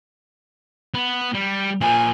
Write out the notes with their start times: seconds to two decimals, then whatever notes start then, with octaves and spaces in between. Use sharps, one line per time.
0.94 B3
1.34 G3
1.81 A#2 F3 G#5